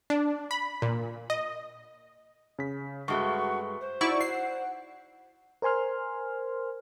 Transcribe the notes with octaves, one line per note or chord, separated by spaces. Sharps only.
D4
B5
A#2
D#5
C#3 B6
G2 G#3 A3 F#4 C#6
C5
D#4 E4 F#4 D5 C#6
F#5 C7
A#4 C5 G#5 C6 F6